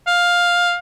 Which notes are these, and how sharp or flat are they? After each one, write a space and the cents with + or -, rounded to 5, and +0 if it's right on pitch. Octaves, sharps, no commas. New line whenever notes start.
F5 +10